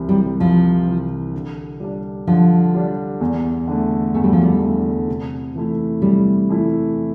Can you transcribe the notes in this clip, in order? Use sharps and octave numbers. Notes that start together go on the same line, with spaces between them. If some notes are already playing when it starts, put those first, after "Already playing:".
Already playing: C2 C3 E3
G3
C2 F3
C3 E3
D3
G3 D4
D3 F3
G3 D4
E2
D3 A3
E2 A3
G3
F3
G3
D3 A3
C3
E3 A3 E4
C3 G3
E3 A3 E4